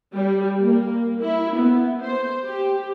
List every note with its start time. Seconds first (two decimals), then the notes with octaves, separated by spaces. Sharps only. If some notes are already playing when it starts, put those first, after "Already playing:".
0.15 G3
0.61 A#3
1.23 E4
1.56 B3
2.02 C5
2.46 G4